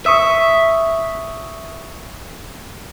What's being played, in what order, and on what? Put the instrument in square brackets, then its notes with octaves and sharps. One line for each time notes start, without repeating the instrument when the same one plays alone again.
[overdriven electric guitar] E5 [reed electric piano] C#6 D#6 E6